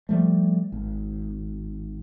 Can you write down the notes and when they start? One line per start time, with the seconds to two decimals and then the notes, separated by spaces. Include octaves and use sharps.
0.09 F3 G3 A3
0.72 G#1